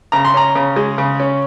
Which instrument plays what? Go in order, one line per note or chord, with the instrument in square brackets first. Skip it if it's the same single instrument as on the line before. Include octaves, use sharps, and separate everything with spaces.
[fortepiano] C#3 A#5
C6
C#4 A#5
C#3
G#3
C#3
C#4